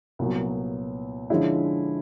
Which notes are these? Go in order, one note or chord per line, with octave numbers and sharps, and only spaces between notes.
C2 A#2 F#3 B3
D3 F3 G#3 C#4 E4